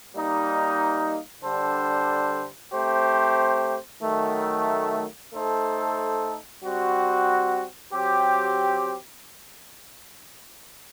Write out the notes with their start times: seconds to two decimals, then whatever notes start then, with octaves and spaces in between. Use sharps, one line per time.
0.14 G3 A#3 D#4
1.43 D3 G3 D4 A4 C5
2.73 A3 C4 G4 C5
4.02 D#3 F#3 A3
5.32 A3 D#4 A4 C5
6.62 G3 C4 F#4
7.92 F#3 C4 G4